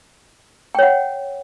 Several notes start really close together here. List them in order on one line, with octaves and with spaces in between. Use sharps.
G5 C#5 F#5